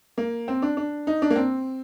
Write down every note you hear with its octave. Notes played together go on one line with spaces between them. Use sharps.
A#3
C4
D4
D4
D#4
D4
A#3
C4